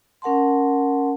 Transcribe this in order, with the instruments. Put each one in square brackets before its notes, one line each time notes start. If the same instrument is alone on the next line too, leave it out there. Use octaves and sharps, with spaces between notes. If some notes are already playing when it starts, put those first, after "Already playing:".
[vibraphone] C#4 A#4 F#5 A5 C6